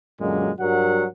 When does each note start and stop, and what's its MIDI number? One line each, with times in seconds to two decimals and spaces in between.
0.20 0.50 42
0.20 0.50 46
0.20 0.50 50
0.20 0.50 54
0.20 0.50 56
0.59 1.05 43
0.59 1.05 54
0.59 1.05 55
0.59 1.05 66
0.59 1.05 70
0.59 1.05 78